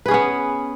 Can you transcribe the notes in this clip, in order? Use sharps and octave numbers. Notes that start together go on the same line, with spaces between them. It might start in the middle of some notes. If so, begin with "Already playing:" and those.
B3 C#4 G#4 B4